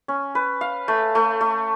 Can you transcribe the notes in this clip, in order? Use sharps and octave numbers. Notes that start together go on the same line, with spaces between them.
C#4
B4
F5
A3
A3
A3